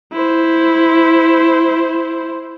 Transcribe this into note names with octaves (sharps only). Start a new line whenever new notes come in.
E4 C5